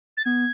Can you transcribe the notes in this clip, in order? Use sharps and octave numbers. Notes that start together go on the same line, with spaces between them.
A6
B3 G#6